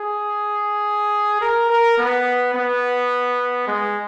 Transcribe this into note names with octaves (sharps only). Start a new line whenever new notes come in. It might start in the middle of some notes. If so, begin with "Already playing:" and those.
Already playing: G#4
A#4
A#4
B3
B3
G#3